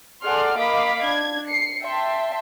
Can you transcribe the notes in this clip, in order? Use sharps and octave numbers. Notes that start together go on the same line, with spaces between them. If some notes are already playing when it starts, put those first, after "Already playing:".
G#4 A4 D5 F#5 C6 F6
A#3 D#5 F5 B5 D6 B6
D4 G#6
C7 C#7
E5 G5 A5 C6